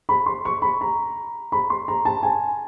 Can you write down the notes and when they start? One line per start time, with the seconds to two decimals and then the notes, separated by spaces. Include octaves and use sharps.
0.09 B5
0.26 C6
0.45 C#6
0.62 B5
0.81 A#5
1.52 B5
1.70 C6
1.88 A#5
2.05 A5
2.23 G#5